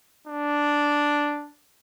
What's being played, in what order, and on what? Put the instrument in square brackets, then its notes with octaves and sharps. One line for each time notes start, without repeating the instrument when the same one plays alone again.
[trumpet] D4